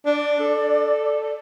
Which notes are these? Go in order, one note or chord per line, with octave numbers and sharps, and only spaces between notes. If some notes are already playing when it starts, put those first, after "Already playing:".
D4 D5
A4